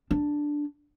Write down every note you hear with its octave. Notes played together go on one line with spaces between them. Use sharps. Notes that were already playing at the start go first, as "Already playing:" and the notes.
D4